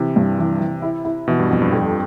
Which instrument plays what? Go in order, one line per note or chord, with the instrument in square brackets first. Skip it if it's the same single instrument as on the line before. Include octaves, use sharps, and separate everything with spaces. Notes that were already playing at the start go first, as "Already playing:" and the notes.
Already playing: [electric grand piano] C3 [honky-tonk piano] E3
[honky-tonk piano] G2
E3
E3
E4
E4
[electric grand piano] B2 [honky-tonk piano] E3
[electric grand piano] G2
[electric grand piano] F2 [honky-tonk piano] B3
[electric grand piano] G2
[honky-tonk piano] F2